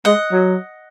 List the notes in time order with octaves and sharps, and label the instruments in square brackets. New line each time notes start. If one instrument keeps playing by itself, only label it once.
[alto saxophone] G#3 [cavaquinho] D#5 F#5
[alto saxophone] F#3